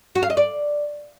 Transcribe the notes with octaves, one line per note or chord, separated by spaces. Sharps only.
F#4
F5
D#5
D5